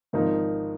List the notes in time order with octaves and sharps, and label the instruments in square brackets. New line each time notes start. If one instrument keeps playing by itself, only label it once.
[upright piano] G#1 G#2 F3 A#3 D#4